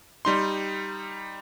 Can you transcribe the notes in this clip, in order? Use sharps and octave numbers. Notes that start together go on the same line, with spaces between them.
G3 D#4 C6